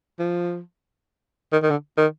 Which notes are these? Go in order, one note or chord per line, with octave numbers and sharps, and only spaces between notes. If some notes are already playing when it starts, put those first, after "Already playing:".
F3
D#3
D#3
D3
D#3